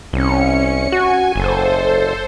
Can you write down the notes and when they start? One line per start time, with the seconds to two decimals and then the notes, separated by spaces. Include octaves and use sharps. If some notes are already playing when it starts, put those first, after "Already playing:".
0.13 C2 C#4 C#7
0.92 F#4 G#5
1.36 F#1 A4 C5